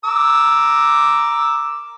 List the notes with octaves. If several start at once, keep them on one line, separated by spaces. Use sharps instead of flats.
A#4 D6 E6